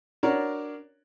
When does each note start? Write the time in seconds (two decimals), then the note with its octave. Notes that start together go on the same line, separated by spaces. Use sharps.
0.23 D4 F#4 A#4 C#5 D5